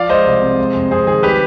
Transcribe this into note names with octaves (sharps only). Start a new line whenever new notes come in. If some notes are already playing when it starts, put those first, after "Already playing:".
Already playing: F3 D5 F5
G#3 C5 D#5
C2
C3
G#3
F2
F2 G#4 C5
D#3 G#4
G3 G4 B4